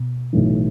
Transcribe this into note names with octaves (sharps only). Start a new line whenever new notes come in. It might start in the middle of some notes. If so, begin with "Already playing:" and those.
Already playing: B2
B1 A2 E3